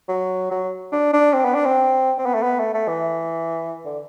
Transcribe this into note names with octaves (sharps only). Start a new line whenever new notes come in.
F#3
F#3
D4
D4
C4
B3
D4
C4
C4
B3
A3
B3
A3
A3
E3
D3